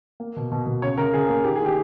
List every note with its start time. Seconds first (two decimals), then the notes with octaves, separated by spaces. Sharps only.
0.20 A#3
0.37 B2
0.52 B2
0.66 B2
0.82 C#3 C#5
0.98 C#3 A#4
1.13 C#3 G#4
1.29 A#3
1.44 D#3 G4
1.56 G#4
1.61 D#3
1.66 G4